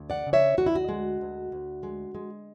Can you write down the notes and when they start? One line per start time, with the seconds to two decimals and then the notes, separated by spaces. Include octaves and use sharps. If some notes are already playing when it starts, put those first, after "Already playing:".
Already playing: D2
0.10 D5 F#5
0.26 C#3
0.33 C#5 E5
0.57 D2 F#4
0.66 E4
0.75 F#4
0.89 G#3
1.21 D2
1.52 D2
1.83 G#3
2.15 G#3